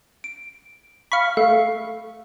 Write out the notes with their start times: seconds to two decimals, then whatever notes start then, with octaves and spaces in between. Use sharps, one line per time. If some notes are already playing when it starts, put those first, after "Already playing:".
0.24 D7
1.12 F5 B5 C#6 C#7
1.37 A3 F5